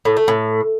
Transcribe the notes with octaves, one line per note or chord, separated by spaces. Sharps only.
A2
A3
A2